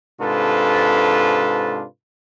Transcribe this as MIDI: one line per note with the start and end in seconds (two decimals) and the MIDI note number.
0.21 1.84 44
0.21 1.84 48
0.21 1.84 62
0.21 1.84 65
0.21 1.84 69
0.21 1.84 71